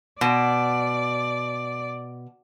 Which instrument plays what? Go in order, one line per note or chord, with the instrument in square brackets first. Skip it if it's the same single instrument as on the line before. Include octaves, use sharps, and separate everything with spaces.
[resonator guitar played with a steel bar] B2 [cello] D5